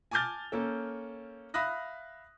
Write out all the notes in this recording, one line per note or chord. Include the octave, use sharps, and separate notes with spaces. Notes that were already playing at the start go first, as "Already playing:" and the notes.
G#5 A5 D6 F6 G6 A6
A#3 C#4 A4
E5 F5 B5 D#6 F#6 A#6